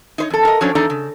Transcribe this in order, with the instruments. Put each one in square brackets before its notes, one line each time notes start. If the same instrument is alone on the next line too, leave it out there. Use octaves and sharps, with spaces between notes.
[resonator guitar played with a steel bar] D#4 C5 C#5
F2 A4
A#4 D#5
F3 F#3 C#4 D4 C5 C#5
E2 D4 D#4 A4 D5 A#5
C#3